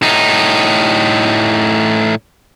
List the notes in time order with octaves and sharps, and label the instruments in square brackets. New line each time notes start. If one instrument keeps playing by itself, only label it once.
[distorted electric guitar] A2 D#4